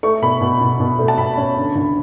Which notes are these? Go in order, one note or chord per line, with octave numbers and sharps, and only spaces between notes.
A3 C#6
B2 B5
B2
B2
B2
A3
A5
B2 B5
C#4
D3
D2